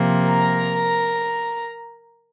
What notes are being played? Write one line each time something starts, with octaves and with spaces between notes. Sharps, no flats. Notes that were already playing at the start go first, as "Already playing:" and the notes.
Already playing: C3 F3 A#3
A#4 A#5